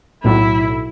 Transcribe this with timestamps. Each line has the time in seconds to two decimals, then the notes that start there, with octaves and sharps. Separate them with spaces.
0.23 B1 A2 F#3 E4